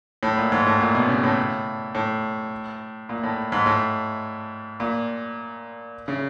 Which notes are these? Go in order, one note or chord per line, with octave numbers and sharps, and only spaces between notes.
A2
A#2
G#2
A2
A#2
B2
C#3
A2
A2
A#2
A2
G#2
A2
A#2
C#3